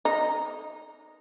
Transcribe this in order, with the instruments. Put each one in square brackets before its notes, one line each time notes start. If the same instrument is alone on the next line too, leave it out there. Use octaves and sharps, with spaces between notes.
[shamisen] D#4